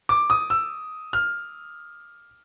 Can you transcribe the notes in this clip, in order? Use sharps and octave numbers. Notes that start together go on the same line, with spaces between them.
D6
D#6
E6
F6